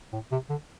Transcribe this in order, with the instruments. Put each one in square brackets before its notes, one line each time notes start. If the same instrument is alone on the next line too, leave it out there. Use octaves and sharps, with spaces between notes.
[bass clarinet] A2
C3
D3